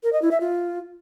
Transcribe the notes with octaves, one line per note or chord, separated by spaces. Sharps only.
A#4
D#5
E4
E5
F4